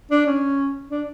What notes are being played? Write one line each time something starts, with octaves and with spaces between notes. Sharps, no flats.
D4
C#4
D4